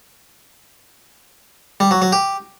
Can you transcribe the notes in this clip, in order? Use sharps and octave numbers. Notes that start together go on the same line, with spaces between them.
G3
F#3
F#3
G4